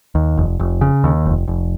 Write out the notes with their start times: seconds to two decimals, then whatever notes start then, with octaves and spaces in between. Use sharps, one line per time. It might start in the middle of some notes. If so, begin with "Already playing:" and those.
0.15 D#2
0.37 F1
0.59 F1
0.81 C#3
1.04 D#2
1.25 F1
1.48 F1